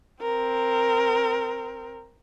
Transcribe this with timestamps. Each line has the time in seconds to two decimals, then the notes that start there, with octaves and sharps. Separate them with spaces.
0.22 C4 A#4